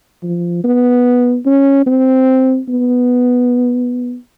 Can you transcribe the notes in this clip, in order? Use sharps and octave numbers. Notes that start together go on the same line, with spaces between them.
F3
B3
C#4
C4
B3